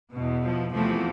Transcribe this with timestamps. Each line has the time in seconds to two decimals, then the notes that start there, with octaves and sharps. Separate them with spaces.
0.13 E2 B2
0.43 F3
0.73 E2 C3 E3 F3 A3